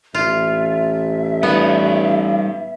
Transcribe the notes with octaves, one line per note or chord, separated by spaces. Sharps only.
A1 F4 E5
G3 B3 D#4 D5